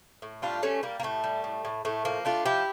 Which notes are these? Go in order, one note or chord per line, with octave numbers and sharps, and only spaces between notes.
A2
G3 D4 F4
G3 A3 C#4
G3 A#3
A#3
A2 A3
G3
A2
A2
A2 A3
F3 A#3
A3 D4 F4
F3 E4 G4